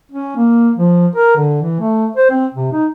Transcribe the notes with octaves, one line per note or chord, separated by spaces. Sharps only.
C#4
A#3
F3
A#4
D3
E3
A3
C5
C4
C3
D#4